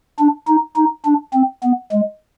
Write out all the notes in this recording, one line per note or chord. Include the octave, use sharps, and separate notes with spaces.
D4
D#4
D#4
D4
C4
B3
G#3